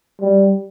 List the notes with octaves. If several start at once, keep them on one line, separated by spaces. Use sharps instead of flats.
G3